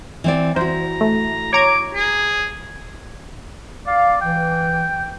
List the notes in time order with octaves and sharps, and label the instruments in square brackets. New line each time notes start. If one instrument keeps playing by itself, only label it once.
[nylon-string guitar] E3 C4 D5
[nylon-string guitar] E4 F#4 [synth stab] C5 [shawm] A#5
[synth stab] A3
[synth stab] C#5 A#5 G#6 [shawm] D6
[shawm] G#4
[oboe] D5 [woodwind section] F5
[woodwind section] E3 [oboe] G5